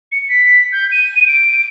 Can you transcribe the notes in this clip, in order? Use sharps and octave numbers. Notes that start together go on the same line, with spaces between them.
C#7
B6
G6
D#7
D7